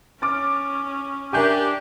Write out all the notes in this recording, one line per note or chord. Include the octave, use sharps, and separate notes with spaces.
C#4 D6 F6 A6
D4 G4 A#4 E5 G5 G#5 G6